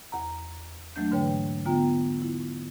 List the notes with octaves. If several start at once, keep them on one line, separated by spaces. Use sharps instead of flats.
E2 F#5 A#5
E3 F#3 A3 A#3 D4 G6
G#2 D3 B4 C#5 G5
D3 B3 F4 G5 A#5
E4